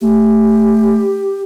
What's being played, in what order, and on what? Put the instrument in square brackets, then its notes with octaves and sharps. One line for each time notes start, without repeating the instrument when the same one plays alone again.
[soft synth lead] A3 [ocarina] G4